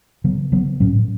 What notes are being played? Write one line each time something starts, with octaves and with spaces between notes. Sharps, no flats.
C#3 F#3 B3
C#3 F#3 B3
A2 F#3 C#4